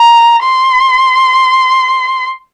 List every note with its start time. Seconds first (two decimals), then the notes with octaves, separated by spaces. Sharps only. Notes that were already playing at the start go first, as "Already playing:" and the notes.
Already playing: A#5
0.43 C6